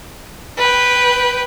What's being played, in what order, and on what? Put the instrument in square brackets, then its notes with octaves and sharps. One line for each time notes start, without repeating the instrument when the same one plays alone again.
[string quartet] B4 G5